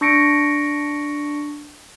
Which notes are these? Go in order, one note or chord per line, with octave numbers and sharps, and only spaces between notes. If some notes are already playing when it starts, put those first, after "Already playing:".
D4 C#6 A#6 C#7 D7